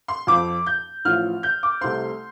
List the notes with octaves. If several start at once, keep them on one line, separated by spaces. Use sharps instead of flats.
C6
F2 F3 C4 D6
G6
A1 A2 F3 F6
G6
D6
C2 C3 A3 C4 C6